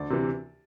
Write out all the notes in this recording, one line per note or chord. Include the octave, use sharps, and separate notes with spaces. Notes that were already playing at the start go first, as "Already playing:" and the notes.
Already playing: D2 D5
C3 E3